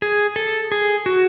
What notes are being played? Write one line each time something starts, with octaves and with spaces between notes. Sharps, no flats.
G#4
A4
G#4
F#4